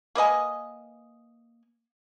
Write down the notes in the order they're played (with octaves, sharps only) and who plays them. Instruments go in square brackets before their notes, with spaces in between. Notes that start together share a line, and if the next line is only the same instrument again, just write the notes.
[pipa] A#3 B4 D#5 G#5